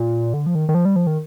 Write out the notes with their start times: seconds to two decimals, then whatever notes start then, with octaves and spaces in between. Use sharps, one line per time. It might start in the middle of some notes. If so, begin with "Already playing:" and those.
Already playing: A#2
0.34 D3
0.46 F3
0.55 D#3
0.69 D#3
0.75 F3
0.85 G3
0.96 F3
1.07 D#3